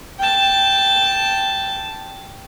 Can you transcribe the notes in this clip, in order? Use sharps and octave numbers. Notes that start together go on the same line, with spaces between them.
G5 A5